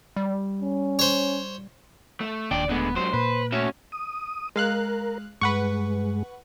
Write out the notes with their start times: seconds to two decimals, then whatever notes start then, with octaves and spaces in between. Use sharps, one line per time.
0.16 G3
0.61 C#4
0.99 C5 C#5
2.21 A3
2.51 D#1 D#2 D4 D5 G5
2.69 D2 D3 G#3 B3
2.96 G#2 F#3 C5
3.13 A#2 B4
3.52 A3 C#4 F#4 E5
3.92 D#6
4.56 G#3 A#4 F5 F#6
5.41 G2 G#3 B4 F#5 C#6